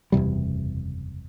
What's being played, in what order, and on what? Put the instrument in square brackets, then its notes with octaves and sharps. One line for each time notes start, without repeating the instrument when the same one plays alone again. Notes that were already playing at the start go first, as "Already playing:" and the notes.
[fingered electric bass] F#1 E2 C3 G3